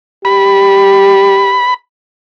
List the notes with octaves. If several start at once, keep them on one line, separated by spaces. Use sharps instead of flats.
G4 B5